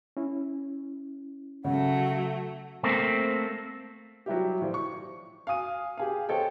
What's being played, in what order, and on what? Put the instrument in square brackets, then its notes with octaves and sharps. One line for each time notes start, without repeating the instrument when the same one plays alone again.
[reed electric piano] C#4 E4
[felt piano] C#3 [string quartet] F#3 A3 [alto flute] F#5
[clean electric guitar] A3 A#3 C4
[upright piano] F#3 G3 E4 G4
A2 F3 C5 D5
C#6
F5 G#5 D#6 D#7
G4 G#4 F5
A4 C5 C#5 D#5 G5